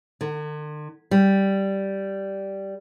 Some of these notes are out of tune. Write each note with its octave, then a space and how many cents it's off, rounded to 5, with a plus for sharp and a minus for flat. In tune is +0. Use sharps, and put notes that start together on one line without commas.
D3 +45
G3 -5